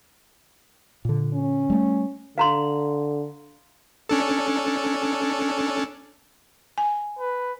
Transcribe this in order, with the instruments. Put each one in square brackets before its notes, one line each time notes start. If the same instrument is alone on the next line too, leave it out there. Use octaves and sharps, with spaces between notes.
[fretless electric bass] A#2 D3
[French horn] C#4
[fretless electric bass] G3 A3
[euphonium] D3 [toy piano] F5 A#5 C6
[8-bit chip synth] C#4 D4 A4
[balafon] G#5
[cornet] B4